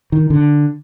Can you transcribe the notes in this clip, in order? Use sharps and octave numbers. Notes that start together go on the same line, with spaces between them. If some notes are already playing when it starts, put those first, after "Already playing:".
D#3
D3